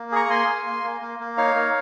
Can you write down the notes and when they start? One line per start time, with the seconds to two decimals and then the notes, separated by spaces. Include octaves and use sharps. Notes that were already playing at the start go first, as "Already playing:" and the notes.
Already playing: A#3
0.12 G#4 A#5 C#6
0.25 A#5
0.29 A#3 G#5 C6
0.48 A#3
0.66 A#3
0.84 A#3
1.01 A#3
1.20 A#3
1.37 D#4 C#5 F5
1.55 A#3